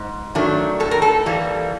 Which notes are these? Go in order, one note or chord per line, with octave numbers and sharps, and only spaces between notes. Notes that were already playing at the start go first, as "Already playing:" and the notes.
Already playing: G#2
D#3 F#3 A3 D4
A2 A4
A#4
A4
E3 G3 A#3